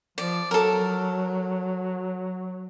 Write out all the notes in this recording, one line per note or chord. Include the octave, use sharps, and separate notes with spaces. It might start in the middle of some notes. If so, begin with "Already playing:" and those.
F3 D5
F#3 A4 A#4